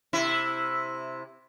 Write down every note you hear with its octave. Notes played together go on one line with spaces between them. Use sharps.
C3 E4